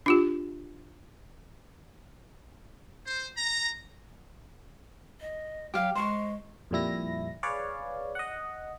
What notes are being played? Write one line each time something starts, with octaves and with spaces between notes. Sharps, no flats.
D4 F4 G4
C5
A#5
D#5
F#3 G4 F5
G#3 C5 C#6
F2 A#2 G3 E4 A#6
G#4 B4 C#5 D5 F5
D#5 F#5